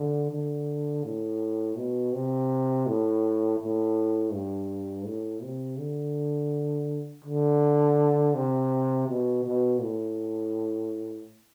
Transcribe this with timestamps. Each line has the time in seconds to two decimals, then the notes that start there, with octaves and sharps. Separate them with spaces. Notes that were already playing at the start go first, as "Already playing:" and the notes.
Already playing: D3
0.31 D3
1.04 A2
1.77 B2
2.13 C3
2.87 A2
3.60 A2
4.33 G2
5.06 A2
5.43 C3
5.79 D3
7.25 D3
8.35 C3
9.08 B2
9.44 B2
9.81 A2